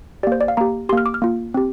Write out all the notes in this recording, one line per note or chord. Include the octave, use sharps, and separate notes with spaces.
A#3 G4 C5 D5
D5
F5
A#3 G4 A#5
A#3 G4 C6 F6
D6
F6
A#3 F4
C4 G4